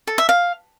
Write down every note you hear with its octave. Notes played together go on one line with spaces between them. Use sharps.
A4
E5
F5